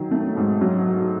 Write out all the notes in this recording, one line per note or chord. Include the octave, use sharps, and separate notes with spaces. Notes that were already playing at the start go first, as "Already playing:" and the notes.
Already playing: D#3 F#3
A3
G#2
F#3